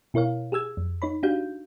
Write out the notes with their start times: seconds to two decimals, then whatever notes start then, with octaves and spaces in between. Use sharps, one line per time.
0.14 B2 E4 A#4 C#5 F5
0.52 G4 G#4 E6 G#6
0.77 F2
1.02 D#4 C#5 B5
1.23 D4 D#4 F#4 G4 F5 G6